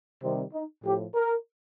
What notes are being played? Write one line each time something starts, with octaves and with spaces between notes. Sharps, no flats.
C3 D#3 G3 C4
D#4
A2 F3 G4
A#4